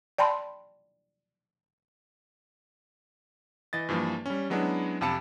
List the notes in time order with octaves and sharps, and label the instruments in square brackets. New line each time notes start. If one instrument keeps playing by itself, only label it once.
[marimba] D5 G5 A5 B5 C6
[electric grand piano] E3 D#5 A6
G2 E3 F3 A#3
G3 C#4
F#3 G#3 B3 C#4 D4 E4
F2 C3 F5 A5 B5 C#7